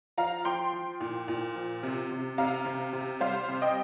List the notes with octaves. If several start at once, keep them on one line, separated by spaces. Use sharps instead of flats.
F3 F5 A#5
F3 G5 C6
F3
A#2
A#2
F3
C3
C3
C3 F5 A#5
C3
C3
G3 C5 F5
C3
D#5 G5